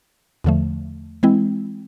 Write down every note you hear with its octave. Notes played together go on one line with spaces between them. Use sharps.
E2 D3 F3 A3
E3 G#3 C4 E4